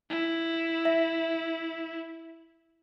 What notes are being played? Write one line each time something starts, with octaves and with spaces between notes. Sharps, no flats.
E4
E5